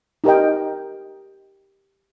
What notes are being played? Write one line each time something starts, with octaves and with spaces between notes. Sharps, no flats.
D#4 G4 A#4 D#5 G5